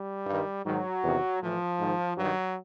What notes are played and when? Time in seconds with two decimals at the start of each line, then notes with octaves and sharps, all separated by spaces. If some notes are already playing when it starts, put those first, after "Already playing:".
Already playing: G3
0.26 G2 D#3
0.65 G#2 D#3 F#3
1.03 E2 C3 D#3
1.42 A2 E3 F3
1.80 G#2
1.85 D#3
2.18 G2 D#3 F#3